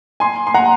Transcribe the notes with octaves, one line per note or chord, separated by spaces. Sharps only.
G#5 C6
C6
F#5 A#5